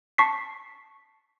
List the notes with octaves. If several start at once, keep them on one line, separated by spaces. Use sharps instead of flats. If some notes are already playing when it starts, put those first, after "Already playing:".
A5 C#6 B6 C7